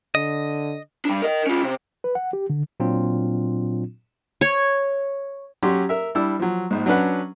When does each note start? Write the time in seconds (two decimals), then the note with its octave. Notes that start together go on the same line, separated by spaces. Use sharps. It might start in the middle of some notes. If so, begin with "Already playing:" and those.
0.15 D3 D#5
1.05 G3 D4
1.22 A#4 D#5
1.47 C#4 F4
1.63 C3
2.04 B4
2.15 F#5
2.33 G4
2.50 D3
2.80 A#2 F#3 C4 D4 F4
4.41 C#5
5.63 F#3 C#4 G4 C6
5.89 A#4 E5
6.15 G3 D4 E4 E6
6.40 F3 F#3
6.71 A#1 G#2
6.86 F#3 C#4 D4 B4 F#5